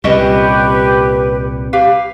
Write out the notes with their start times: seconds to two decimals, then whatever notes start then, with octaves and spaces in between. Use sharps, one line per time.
0.04 C2 A#2 C#4 G4 B4 D#5
1.73 G4 B4 F5